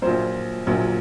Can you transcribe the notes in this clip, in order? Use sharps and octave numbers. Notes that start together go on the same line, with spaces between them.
A#1 A#2 F#3 C5
A#1 A#2 F#3